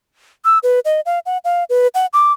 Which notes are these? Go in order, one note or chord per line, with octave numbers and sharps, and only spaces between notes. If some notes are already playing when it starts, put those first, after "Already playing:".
E6
B4
D#5
F5
F#5
F5
B4
F#5
D6